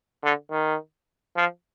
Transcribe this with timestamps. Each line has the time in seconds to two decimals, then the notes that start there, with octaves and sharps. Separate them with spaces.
0.24 D3
0.51 D#3
1.37 F3